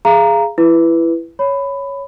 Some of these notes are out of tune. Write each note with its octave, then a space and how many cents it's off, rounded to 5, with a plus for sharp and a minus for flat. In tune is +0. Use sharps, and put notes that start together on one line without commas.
G#4 +0 F5 -25 A#5 +0
E4 +15 B4 +0
C#5 +0 B5 +15